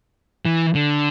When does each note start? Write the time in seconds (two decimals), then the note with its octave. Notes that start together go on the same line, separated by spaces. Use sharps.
0.45 E3
0.75 D3